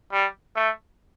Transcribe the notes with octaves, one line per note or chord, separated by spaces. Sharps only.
G3
A3